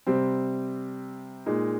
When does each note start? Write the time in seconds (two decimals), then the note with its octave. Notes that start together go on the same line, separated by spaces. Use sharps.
0.07 C3 G3 C4
1.46 A#2 G#3 D#4